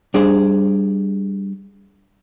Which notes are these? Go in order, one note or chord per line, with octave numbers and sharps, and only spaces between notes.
G3 D4 G#4 C5 F5